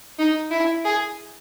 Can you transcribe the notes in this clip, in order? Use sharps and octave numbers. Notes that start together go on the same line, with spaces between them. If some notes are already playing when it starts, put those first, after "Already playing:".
D#4
E4
G#4